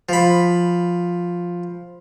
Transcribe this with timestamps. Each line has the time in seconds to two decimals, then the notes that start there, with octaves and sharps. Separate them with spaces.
0.09 F3 B5